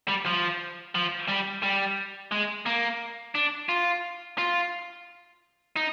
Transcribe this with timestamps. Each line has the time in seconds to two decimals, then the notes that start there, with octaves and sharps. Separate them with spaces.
0.08 G3
0.26 F3
0.95 F3
1.28 G3
1.63 G3
2.32 G#3
2.66 A#3
3.35 D4
3.69 F4
4.38 F4
5.76 D#4